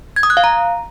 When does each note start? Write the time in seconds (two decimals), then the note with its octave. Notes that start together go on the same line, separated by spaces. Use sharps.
0.16 G#6
0.23 D#6
0.30 F#6
0.37 F5
0.44 A#5